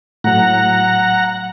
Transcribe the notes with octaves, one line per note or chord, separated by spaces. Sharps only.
A2 F#3 F#5 A#5